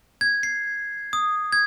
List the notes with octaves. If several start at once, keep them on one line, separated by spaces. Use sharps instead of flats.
G#6
C7
D#6
G#6